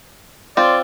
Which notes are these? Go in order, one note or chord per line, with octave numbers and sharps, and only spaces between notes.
C4 F4 D5